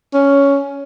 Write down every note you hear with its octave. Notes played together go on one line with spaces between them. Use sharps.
C#4